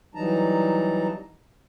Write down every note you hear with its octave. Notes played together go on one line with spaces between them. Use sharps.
E3 F#3 G3 D#4 A5 A#5